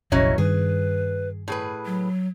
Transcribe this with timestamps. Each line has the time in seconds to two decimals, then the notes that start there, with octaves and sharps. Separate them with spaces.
0.12 F1 A#1 F#3 C#4 E4 D#5
0.38 G2 D#3 G#4 B4
1.48 A2 G#4 B4
1.86 F#3